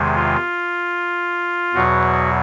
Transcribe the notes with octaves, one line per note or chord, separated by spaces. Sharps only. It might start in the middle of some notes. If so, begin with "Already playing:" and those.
Already playing: E2 C3 D#3 G#3
F4
E2 B2 F#3 F#4